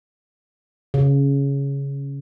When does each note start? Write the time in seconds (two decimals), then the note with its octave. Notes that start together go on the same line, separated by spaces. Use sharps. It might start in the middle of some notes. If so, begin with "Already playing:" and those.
0.94 C#3